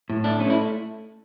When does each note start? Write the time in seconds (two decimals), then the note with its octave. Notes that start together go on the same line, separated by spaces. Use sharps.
0.10 A2
0.24 A3 D4
0.40 A3 C#4
0.50 E4